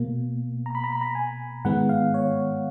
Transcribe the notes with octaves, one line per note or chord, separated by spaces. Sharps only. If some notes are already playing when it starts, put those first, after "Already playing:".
Already playing: B2 A#3
A#5
B5
A#5
B5
A#5
G#5
G#2 D#3 G#3 B3 F#5
F5
C#5